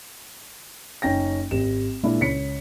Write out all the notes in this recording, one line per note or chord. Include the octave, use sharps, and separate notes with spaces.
F#1 C#4 D#4 G5 A#6
G#1 G4 E7
A#2 G#3 A#3 D4 E4
C#2 C#5 B6 C#7